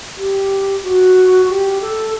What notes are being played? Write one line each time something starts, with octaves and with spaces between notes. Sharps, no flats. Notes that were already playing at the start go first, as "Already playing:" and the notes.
G4
F#4
G4
A4